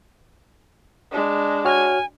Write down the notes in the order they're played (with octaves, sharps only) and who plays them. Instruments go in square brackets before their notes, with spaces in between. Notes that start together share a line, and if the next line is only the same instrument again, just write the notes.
[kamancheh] G#3 D4
[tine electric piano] F#4 C#5 F6 [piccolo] G#5